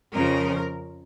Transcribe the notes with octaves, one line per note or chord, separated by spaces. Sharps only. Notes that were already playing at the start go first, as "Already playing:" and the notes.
F2 C#3 F3 A#4